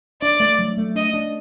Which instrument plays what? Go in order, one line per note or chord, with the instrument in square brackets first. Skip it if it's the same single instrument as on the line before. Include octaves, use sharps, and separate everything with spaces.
[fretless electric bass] D4 [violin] D5
[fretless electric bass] A3
F#3
A3
[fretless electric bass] D4 [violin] D#5
[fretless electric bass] D4